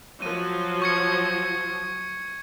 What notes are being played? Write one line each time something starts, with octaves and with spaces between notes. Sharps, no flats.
F3 F#3 D#7
C#6 G#6 C#7